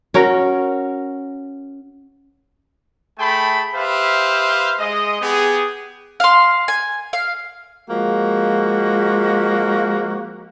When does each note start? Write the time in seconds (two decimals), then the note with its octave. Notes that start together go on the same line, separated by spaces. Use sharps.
0.14 C#4 F#4 A#4
3.19 A3 G#4 G5 A5 B5
3.74 G4 B4 C5 E5 F5
4.79 G#3 D#5
5.21 B3 G4 G#4
6.20 F5 C6
6.68 G#5
7.13 F5
7.90 F3 G#3 A#3 F#4